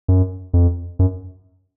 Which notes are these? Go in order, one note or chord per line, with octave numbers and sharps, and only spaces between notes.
F#2
F2
F#2